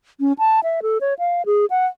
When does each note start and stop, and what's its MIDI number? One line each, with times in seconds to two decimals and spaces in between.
0.20 0.33 61
0.39 0.60 81
0.64 0.80 76
0.82 0.98 69
1.01 1.14 73
1.19 1.45 77
1.46 1.66 68
1.70 1.86 78